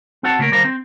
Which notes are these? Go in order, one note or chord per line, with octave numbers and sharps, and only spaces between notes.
C4 F#4 A4 F#5 A5
C#3 A3 A#3 A#4
D#2 G3 A4 A#4 C5 F5
C4